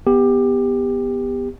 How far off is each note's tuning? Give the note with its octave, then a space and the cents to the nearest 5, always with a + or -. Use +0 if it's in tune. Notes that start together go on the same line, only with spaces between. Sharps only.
B3 +0 G4 +20